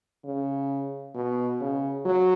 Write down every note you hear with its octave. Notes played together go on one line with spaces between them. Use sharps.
C#3
B2
C#3
F#3